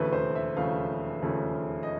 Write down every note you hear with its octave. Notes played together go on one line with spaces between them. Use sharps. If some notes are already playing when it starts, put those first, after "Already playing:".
Already playing: E1 D#2 C#3 F3 A3 B4
C5
E5
E1 D#2 C#3 F3 A3 F5
E1 D#2 C#3 F3 A3
D#5